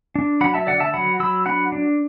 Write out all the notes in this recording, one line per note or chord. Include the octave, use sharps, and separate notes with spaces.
D4
F#3 F#5 B5
E5 A5
D3 D5 F#5
E5 A5
F#3 F#5 B5
F#3 B5 E6
D4 F#5 B5
D4